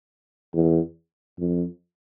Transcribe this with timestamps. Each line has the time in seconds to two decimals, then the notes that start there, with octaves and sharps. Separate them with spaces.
0.54 E2
1.38 F2